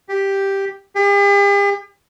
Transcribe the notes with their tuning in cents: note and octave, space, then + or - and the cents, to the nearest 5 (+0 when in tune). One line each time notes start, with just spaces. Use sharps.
G4 +0
G4 +45